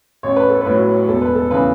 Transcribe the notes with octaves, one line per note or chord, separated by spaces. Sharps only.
A1 C#5
B4
A4
B4
A2 F#3
E1 A4
B4
A4
C#3 E3 B4